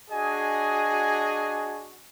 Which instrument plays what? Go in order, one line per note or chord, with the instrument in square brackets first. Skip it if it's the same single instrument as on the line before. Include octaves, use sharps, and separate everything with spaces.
[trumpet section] D4 F#4 G#4 D#5 G#5